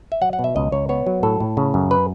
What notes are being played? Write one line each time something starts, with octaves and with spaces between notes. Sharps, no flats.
E5
F#3 F#5
F#5
B2
E5
C#2 D#5
C#2 C#5
B3 C#5
F#3
A2 A4
A2
C#3
F#2
B4